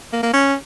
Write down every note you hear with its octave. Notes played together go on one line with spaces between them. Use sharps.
A#3
A#3
C#4